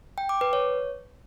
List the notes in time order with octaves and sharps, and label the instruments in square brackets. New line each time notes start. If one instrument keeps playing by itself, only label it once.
[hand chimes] G5
D6
B4
C#5